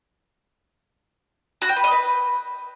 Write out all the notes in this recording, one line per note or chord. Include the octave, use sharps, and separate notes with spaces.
F#4
G5
B4
D#5
B4